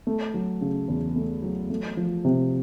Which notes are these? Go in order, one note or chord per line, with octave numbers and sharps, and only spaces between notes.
A3
F#3
C#3
E2
A3
F#3
A3
F3
C3